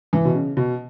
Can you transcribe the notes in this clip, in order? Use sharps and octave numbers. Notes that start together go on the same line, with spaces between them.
E3
B2
C#3
B2